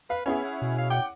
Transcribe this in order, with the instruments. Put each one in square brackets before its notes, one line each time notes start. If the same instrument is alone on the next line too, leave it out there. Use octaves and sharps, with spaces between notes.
[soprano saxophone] B4 [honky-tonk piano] F5
[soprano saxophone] B3 [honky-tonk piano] C#4 E4 G#4
[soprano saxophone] F#5
[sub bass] B2
[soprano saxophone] F5
[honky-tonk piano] C#5 F#5 D6 [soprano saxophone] G5